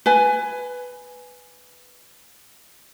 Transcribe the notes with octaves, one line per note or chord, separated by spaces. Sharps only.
B4 G#5